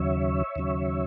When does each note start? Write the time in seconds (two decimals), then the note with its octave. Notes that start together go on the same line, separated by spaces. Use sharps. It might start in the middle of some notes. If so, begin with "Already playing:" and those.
Already playing: D#2 C#3 F#3 C#5 E5
0.56 D#2 C#3 F#3